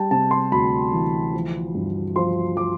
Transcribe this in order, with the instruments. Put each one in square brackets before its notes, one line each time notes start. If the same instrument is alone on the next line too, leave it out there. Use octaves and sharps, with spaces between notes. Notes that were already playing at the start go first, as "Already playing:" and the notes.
Already playing: [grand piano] G3 G5 A5
C3 A5
C6
D2 B5
E3
F3
G2
F3 C6
F3 D6